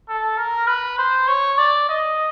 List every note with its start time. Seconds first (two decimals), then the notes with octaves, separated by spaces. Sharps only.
0.08 A4
0.37 A#4
0.67 B4
0.98 C5
1.28 C#5
1.58 D5
1.89 D#5